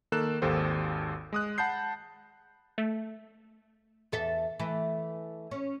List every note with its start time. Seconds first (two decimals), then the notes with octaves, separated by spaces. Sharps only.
0.12 D#3 A#3 A4 F#6 E7
0.42 G#1 D#2 G4 A4 C5
1.33 G#3 D#6 F#6
1.58 F#5 A5 B5 G6 C7
2.78 A3
4.12 E2 A4 E5
4.60 E3 A3
5.51 C#4